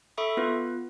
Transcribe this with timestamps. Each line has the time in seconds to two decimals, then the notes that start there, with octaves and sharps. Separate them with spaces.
0.18 A4 E5 B5 C#6 D#6
0.37 B3 F4 B4